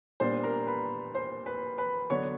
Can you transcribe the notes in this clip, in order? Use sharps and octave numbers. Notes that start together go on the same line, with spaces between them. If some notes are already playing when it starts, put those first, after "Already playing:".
A#2 G3 B3 D4 C5 C6
A#4 A#5
B4 B5
C5 C6
B4 B5
B4 B5
D3 F#3 B3 D4 C#5 C#6